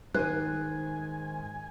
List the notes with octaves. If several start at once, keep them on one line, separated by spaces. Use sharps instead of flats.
G#2 D#3 C5 G#5 F#6